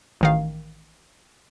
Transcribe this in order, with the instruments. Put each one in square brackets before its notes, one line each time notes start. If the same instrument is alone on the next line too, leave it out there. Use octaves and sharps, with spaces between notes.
[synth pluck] A1 D#3 F5